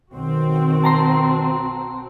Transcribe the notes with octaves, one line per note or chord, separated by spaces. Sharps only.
B1 D#3 C4 F#4
A5 A#5 C6